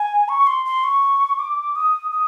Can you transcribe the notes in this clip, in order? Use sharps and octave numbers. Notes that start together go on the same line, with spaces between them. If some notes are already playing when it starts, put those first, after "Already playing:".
Already playing: G#5
C#6
C6
C6
C#6
D6
D#6
D#6